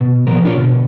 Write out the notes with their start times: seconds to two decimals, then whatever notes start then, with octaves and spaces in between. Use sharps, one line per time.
0.01 B2
0.27 A#2 F3 B3 A#4
0.45 D4 F4 A#4 C#5
0.57 B2 D3